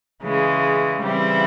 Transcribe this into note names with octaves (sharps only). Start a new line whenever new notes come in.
C#3 E3 G#3
C#3 E3 G3 C4 E4